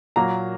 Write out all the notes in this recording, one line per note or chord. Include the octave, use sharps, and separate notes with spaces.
A#2 F#3 A#3 A#5